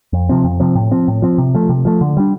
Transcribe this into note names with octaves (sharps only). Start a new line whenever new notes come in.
F2
C3 F3 C4
F2
C3 F3 C4
A2
F3 C4
A2
F3 C4
C3
F3 A3
C3
F3 A3
D3
G3 D4